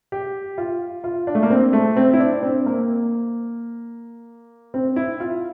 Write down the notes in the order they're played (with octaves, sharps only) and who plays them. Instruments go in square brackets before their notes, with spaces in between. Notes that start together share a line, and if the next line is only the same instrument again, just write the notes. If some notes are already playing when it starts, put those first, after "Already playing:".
[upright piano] G4
F4
F4
D4
A3
A#3
C4
A3
C4
E4
D4
C4
A#3
C4
E4
F4